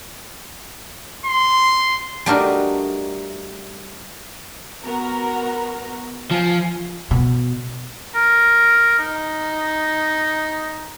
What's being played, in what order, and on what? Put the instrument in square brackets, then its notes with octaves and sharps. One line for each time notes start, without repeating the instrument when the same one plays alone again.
[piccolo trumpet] C6
[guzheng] G3 A3 D4 D#4 F#4 A#4
[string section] B3 F#4 A#4
[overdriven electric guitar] F3 [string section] G#5 C7
[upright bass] B2
[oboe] A#4
D#4